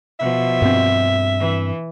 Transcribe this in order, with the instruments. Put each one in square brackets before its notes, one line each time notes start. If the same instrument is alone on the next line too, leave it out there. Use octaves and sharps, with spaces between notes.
[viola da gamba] B2 F3 [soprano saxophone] E5
[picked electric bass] G2 C4
[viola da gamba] E3